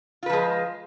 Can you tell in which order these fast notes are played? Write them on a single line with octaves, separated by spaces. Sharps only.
F4 B4 F3 G#3